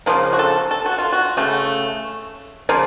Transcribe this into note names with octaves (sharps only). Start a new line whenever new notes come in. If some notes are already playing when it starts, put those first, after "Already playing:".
C#3 F3 A#3
F#4
A4
A4
F#4
F4
F#4
C#3 A3
C#3 F3 A#3